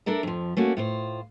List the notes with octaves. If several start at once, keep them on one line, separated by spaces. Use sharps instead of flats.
D4 A4 A#4 D5 E5
F2 F3
A3 A#3 C#4 F#4
A2 F4 C5